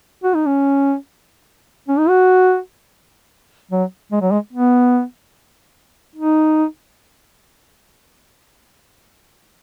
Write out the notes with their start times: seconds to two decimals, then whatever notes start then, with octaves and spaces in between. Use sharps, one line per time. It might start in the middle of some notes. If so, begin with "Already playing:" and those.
0.24 F#4
0.35 D#4
0.46 C#4
1.88 C#4
1.99 D#4
2.09 F#4
3.71 F#3
4.12 G#3
4.22 F#3
4.32 G#3
4.53 B3
6.16 D#4